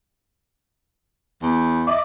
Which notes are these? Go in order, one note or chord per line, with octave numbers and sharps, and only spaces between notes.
E2
D#5 E5 D6